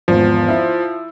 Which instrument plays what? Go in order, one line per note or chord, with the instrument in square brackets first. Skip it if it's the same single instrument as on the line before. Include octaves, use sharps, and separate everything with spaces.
[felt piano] G#1 E2 [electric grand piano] F3
[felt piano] E4 E5